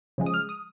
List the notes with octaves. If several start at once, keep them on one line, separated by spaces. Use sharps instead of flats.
C#3 F3 G#3
D#6
F6
D#6